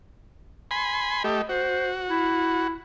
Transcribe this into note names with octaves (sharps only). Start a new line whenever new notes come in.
G#5 B5 C6
A3 G4 D#5
F#4 C5
E4